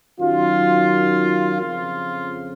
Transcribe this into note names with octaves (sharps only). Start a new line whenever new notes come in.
F#2 D#3 F#3 F4
F2 C#3 F3 F4